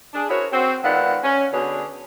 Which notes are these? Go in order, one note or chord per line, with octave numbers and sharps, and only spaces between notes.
D4 G#4
E4 F#4 G#4 A#4 C5 C#5
C4 F#4 C5
G#2 D#3 B3 F4 D5 F#5
C#4
B2 D3 D4 G#4 B4 C#5